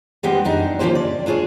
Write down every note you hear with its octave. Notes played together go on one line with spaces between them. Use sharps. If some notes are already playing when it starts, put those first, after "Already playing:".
G3 G#3 B3 C4 D4 G4
F#2 D4 D#4
C#3 F3 A#3 C#4 G4 C5
D5
D4 F4 G#4 B4 C#5